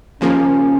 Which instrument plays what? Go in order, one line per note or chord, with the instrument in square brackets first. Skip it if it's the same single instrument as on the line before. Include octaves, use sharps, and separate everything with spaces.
[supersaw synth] D#2 C#3 F3 A#3 [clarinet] C#4